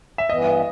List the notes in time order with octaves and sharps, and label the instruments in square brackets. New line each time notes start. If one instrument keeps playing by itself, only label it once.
[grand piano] E5
[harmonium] G2 E3 B3 [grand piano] D#5